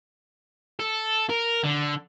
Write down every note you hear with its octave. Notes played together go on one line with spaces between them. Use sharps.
A4
A#4
D3